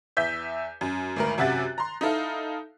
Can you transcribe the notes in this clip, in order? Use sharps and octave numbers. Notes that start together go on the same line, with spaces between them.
E2 E5 G6 B6
F#2
G#1 D2 A#4
F#2 C3 F#4 E5 F#6 A6
A#5 C6
D#4 E4 A4 F5